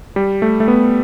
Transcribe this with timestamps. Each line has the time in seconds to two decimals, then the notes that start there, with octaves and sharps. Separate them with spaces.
0.16 G3
0.42 A3
0.60 A3
0.68 B3